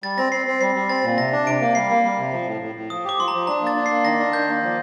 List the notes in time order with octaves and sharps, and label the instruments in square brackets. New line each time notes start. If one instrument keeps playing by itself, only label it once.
[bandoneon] G3 [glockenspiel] A6
[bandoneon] C4 [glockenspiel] A#6
[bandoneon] C4 [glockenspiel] C7
[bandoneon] C4
[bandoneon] G3 [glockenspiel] C7
[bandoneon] G3
[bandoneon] C4 [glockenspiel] A6
[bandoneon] A#2
[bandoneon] C3 [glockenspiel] A#6
[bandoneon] D4
[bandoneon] C3 [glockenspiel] D7
[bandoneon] A#3
[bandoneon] G3 [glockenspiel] C7
[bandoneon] A#3
G3
C3
F3
A2
A2
A2
[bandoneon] F3 [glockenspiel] D#6
[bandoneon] G4 [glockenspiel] D6
[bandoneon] F3 [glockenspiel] C6
[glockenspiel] A#5
[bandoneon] F3
[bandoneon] D4 [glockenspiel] A#5
[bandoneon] A#3
[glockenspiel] A6
[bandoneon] D4
[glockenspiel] C7
[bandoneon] A#3
[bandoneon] D#3 [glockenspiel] A#6
[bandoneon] D4
[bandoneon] D#3 [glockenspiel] G6
[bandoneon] A#3
F3